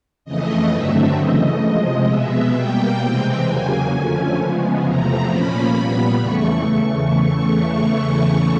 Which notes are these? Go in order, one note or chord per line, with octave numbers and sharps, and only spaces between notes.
F2 C#3 E3 A3 D#5
G2 D3 F#3 A3 C4 E5
C#3 E3 A3 D#5
C3 F3 G#3
B2 G#3 B3 E5
B2 G3 A#3 G5
C3 E3 G#3 C4 G5
E2 C#3 F#3 A#3 G#5
F2 D3 F3 A3 C#4
C#3 F3 G#3 B3
E2 C3 F3 A3 A#5
A#2 F3 A#3 C#4 B5
A#2 G3 B3
E2 C#3 E3 A3 C#6